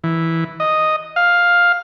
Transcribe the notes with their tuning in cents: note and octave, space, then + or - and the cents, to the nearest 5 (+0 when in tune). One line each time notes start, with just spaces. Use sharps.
E3 -5
D#5 +0
F5 +5